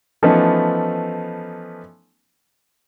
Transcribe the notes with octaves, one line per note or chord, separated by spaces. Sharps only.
E3 F3 A3 B3 C#4 D#4